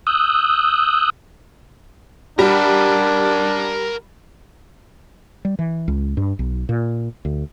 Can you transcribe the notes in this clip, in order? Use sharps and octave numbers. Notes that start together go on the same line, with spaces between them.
D#6 E6 F#6 G6
G3 D4 A#4 F#5
G3
E3
C#2
G2
B1
A#2
D2